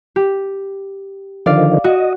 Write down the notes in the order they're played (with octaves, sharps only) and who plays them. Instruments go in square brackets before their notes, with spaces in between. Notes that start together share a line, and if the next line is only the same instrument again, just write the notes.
[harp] G4
[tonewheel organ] D3 D#3 F3 [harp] D5 F5
[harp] F#4 [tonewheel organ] D#5